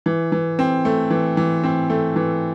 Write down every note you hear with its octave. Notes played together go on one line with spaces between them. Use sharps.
E3
E3
C4
A3
E3
E3
C4
A3
E3